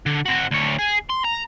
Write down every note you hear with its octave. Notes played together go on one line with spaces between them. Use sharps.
D3
C4 F#4
D2 C#5
G#4
C6
A#5